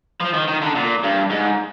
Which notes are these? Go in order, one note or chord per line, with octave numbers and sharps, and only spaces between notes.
F3
D#3
D#3
D3
A#2
G2
G#2